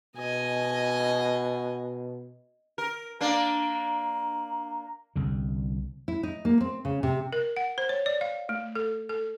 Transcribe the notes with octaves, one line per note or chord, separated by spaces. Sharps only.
B2 D#5 G#5
A#4
A#3 D4 A#5
C2 D3
E4
D#4
A#3
C4
C#3
C3
A#4
F#5
C5
C#5
D5
F5
A3
A4
A4